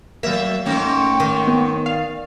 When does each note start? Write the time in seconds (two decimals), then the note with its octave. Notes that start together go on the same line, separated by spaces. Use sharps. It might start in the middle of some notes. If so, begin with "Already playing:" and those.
0.23 F#3 A#3 E5
0.66 G#2 A3 C#4 G5
1.20 D#3
1.47 B3
1.86 D5 F5